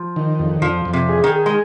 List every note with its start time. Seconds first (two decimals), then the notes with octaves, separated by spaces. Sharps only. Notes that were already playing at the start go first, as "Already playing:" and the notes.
Already playing: F3
0.16 D#3
0.39 F2
0.62 F2 F3
0.85 F2
0.93 C3
1.09 G#4
1.24 D#3
1.32 G#4
1.46 G#3